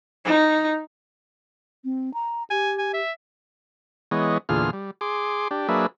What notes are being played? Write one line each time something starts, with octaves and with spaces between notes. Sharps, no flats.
D#4
C4
A#5
G4 G#5
G#5
E5
E3 G#3 B3 C#5 D#5
E2 A#2 D3 F4 G#4 F6
G3
G#4 C6 D6
D4 G4
F#3 A#3 D4 G#4 B4 E5